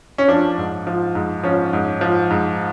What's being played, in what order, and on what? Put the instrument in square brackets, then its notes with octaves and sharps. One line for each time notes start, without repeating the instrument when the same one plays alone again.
[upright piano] C#4
F3 D4
G#2
F3
G#2
F3 C#4
G#2
F3
G#2